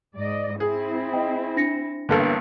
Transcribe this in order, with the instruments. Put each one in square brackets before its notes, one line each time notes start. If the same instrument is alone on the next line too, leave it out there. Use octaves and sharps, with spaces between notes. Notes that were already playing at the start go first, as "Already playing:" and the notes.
[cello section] G#2 D5 D#5
[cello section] C4 E4 [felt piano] G#4
[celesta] D#5 G5
D4 A#6 C#7
[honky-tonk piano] A1 G2 D3 [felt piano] A#3 B3 A4